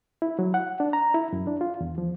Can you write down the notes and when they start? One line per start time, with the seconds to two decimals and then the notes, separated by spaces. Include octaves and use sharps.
0.22 E4
0.39 F#3
0.54 F#5
0.80 D4
0.93 A#5
1.14 E4
1.33 F#2
1.47 D4
1.61 F4
1.81 E2
1.98 F3